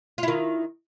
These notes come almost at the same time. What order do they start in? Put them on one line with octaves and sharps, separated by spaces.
F4 E4 D#3